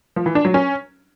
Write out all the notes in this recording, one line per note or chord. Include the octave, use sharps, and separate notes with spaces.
F3
E3
D4
F#3
C#4